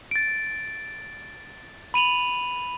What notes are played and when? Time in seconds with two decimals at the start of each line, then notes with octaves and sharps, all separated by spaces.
0.11 A6 D7
1.94 B5 D#7 F7 F#7